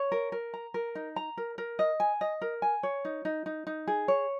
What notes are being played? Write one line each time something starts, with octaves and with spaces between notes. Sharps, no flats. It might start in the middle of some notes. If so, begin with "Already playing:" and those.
Already playing: C#5
A#4
A#4
A#5
A#4
D#4
A#5
A#4
A#4
D#5
G#5
D#5
A#4
G#5
C#5
D#4
D#4
D#4
D#4
G#4
C#5